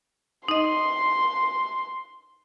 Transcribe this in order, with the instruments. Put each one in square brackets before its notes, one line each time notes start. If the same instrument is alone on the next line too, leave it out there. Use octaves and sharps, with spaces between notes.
[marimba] D#4 D#5 [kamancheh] C6